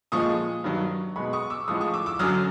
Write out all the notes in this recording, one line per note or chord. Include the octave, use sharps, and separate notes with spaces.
A#2 F3 G#3 C#6 D#6
G2 D#3 F#3
B2 G#3 B5 C#6
C#6 D#6
D6 E6
A2 F3 G#3 C#6 D#6
C#6 D#6
D6 E6
D6 E6
F#2 D3 F#3 D#6 F6